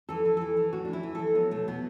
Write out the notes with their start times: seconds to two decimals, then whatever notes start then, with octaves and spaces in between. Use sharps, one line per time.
0.09 E3 A4
0.25 E3
0.37 E3 A4
0.57 E3
0.72 A2 F#4
0.85 D4
0.88 E3 E4
1.03 E3
1.15 E3 A4
1.35 F#3 B3
1.51 B2 A3
1.68 B2 B3